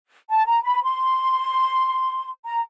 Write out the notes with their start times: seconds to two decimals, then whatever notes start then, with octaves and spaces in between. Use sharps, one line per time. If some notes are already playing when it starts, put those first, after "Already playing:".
0.28 A5
0.46 A#5
0.64 B5
0.83 C6
2.45 A#5